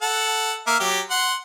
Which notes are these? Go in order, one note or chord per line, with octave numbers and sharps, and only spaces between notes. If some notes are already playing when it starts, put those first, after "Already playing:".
A4 F#5
A#3 E5 F6
F#3 G4
F#5 C6